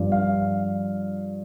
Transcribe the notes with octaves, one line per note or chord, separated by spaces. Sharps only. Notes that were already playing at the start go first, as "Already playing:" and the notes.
Already playing: G2 F3
F5